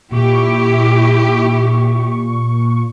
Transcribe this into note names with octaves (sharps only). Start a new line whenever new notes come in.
A#2 E4 G4 C#6